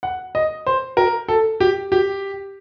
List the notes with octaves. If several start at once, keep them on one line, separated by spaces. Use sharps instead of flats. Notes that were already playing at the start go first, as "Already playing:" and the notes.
F#5
D#5
C5
A#4
A4
G4
G4